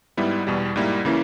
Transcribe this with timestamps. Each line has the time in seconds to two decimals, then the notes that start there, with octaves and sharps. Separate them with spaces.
0.17 G#2 G3 B3 E4
0.47 E2 B2 G3
0.76 G#2 G3 A#3 E4
1.05 C#3 E3 A#3 C#4 E4